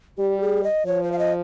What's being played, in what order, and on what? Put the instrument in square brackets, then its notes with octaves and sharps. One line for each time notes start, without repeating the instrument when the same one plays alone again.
[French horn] G3 [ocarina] G4
[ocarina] G#4
D#5
[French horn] F3 [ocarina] C#5
[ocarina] C5
F5
D#5